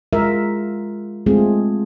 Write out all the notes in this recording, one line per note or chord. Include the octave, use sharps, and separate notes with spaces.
G#3 F4 A#4 E5
G#3 A3 C4 F4 G#4